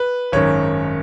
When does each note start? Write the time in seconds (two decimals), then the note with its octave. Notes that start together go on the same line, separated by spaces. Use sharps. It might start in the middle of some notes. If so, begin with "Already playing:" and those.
Already playing: B4
0.32 G#1 F#2 D#3 C#5